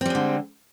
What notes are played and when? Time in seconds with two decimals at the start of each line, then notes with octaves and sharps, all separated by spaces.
0.01 C4
0.06 G3
0.10 G#3
0.15 D3